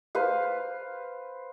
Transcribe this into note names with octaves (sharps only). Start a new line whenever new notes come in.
B4 C5 F5